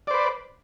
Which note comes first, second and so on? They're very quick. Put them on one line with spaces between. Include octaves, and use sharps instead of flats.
D5 C5 B4